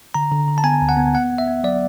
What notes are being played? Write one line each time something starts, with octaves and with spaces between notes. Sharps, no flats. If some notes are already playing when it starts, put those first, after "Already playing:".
D3 A#5
D3
D3
A5
B3 G#5
D2
F#5
B3
B3 F#5
B3
E5
B3
F#3 D5